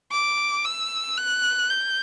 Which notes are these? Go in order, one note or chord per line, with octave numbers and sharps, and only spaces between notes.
D6
E6
F#6
G6